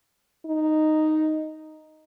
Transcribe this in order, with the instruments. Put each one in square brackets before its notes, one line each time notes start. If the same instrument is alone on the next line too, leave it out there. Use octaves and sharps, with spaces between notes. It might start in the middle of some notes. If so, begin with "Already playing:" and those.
[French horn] D#4